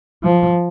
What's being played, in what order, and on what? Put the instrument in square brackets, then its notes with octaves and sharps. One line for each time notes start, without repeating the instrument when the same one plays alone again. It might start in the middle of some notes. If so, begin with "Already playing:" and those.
[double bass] F3